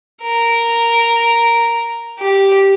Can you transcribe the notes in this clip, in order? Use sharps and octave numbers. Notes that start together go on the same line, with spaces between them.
A#4
G4